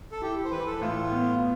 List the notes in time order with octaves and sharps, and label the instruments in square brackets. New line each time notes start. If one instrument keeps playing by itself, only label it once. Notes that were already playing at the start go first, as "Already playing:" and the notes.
[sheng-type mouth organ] A4
[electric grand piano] E4 [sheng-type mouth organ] G4
[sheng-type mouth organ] C5
[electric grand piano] E3 [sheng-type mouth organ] B4
[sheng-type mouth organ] A4
[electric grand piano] A2 [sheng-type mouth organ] F4
[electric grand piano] B3